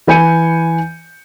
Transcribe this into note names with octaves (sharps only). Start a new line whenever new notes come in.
E3 B4 G#5 G6 C#7 D#7